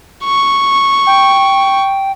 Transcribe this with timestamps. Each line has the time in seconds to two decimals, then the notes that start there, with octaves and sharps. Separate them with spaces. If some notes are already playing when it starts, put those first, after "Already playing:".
0.25 C#6
1.07 G5